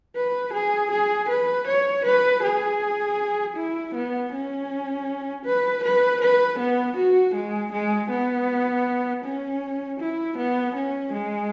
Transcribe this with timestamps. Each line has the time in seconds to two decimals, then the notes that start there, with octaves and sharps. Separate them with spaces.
0.16 B4
0.53 G#4
0.91 G#4
1.29 B4
1.67 C#5
2.05 B4
2.43 G#4
3.56 E4
3.94 B3
4.32 C#4
5.46 B4
5.83 B4
6.21 B4
6.59 B3
6.97 F#4
7.35 G#3
7.72 G#3
8.10 B3
9.24 C#4
10.00 E4
10.38 B3
10.75 C#4
11.13 G#3